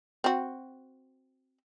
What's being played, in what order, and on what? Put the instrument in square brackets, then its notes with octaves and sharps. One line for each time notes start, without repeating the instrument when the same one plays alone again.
[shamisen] C4 F#4